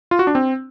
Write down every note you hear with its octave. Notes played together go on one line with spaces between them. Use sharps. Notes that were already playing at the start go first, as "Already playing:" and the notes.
F4
F#4
D4
C4